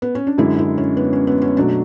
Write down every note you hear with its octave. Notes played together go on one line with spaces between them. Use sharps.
B3
C#4
D4
F#2 D3 G#3 E4
E4
C#4
B3
C#4
B3
C#4
B2 F#3 A3 D4